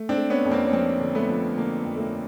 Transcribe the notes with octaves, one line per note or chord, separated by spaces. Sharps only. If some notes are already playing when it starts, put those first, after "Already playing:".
Already playing: A3
C4 D4
A3
B3 C#4
F2
A#3 C4
C#4
F3 A#3 C4
D3
A3 B3
F3
D3 A#3
F2
A3
A#3